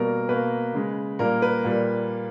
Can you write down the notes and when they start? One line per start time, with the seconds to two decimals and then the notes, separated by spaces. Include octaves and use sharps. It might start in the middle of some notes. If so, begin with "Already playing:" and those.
Already playing: B2 G3 A#3 A#4
0.29 B2 A#3 B4
0.74 C#3 G#3
1.19 A#2 G3 A#3 A#4
1.42 B4
1.64 A#2 G3 A#3